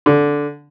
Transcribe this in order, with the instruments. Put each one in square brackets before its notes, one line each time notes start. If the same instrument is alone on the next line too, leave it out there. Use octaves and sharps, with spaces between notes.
[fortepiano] D3